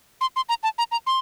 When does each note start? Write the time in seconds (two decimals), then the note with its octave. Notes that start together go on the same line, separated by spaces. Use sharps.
0.21 C6
0.36 C6
0.49 A#5
0.63 A5
0.78 A#5
0.92 A#5
1.07 C6